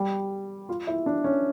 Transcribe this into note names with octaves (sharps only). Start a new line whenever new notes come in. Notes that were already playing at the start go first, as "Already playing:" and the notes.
Already playing: G3
F4
E4
D4
C#4